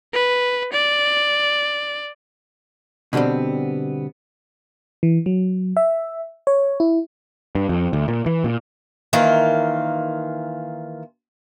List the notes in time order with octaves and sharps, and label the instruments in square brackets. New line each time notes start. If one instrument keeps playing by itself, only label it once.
[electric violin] B4
D5
[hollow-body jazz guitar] B2 D3 G3 B3 C4
[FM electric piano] E3
F#3
E5
C#5
E4
[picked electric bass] G2
F2
D2
A#2
E3
A#2
[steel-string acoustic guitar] D#3 E3 A#3 F4